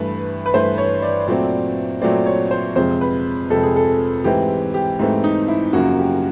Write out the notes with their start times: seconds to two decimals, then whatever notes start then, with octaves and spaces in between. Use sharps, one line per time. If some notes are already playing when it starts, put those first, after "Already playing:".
Already playing: G2 E3 A3 B4
0.46 B4
0.54 G2 E3 A3 C5
0.78 C#5
1.02 D5
1.27 A#2 F#3 A3 C4 D5
2.02 A#2 F#3 A3 C4 D5
2.26 C#5
2.51 C5
2.76 F2 C3 F3 G#3 C5
3.01 B4
3.50 F2 C3 F3 G#3 A4
3.63 G#4
3.76 A4
4.24 G#2 E3 A3 C4 G4
4.74 G4
4.99 G#2 E3 A3 C4
5.24 D#4
5.48 E4
5.73 F#2 C#3 F3 A#3 F#4
5.98 G4